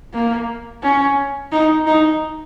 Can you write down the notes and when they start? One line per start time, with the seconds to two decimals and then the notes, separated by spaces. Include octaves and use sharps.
0.13 A#3
0.82 C#4
1.52 D#4
1.86 D#4